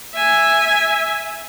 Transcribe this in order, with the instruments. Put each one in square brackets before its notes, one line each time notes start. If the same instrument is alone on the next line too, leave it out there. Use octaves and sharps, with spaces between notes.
[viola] E5 G#5